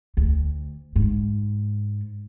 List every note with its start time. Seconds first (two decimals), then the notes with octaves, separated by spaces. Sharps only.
0.17 D2
0.96 G#2